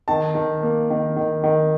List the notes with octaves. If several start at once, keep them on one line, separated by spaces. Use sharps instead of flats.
D#3 A5
D#3
A#3
D#3
D#3
D#3